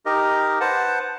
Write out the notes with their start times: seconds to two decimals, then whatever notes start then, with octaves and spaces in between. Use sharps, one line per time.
0.06 D#4 G4 A#4 D#5
0.60 B4 C5 F#5 A5